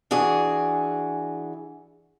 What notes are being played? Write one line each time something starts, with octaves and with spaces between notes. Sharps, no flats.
E3 D4 F#4 G#4